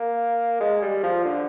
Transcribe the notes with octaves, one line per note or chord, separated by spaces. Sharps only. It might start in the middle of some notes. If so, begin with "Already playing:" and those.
Already playing: A#3
G#3
G3
F3
D3